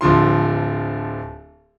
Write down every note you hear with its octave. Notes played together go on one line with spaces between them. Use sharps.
D1 D3 F3 C6